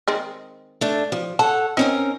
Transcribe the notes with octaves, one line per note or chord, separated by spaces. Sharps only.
D#3 G#3 C4
A3 D4
F3
A4 C#5 F#5 A5
C4 C#4 D#4 A#4